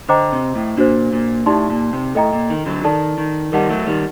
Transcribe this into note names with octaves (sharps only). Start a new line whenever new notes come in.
D3 C5 D#5 G5 A#5 D6
C3
A2
A#2 D4 F#4 C5
A#2
A2 D#4 G4 D5 A5 C6
A#2
C3
A2 A4 D#5 G5 A#5
A#2
D#3
D3 F#3
D#3 A4 D5 A5
D#3
D#3 G3 A#4 D#5 F#5 A5
F#3 A3
D#3 G3